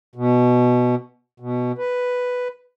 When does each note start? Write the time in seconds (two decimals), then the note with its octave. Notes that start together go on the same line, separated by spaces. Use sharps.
0.15 B2
1.40 B2
1.78 B4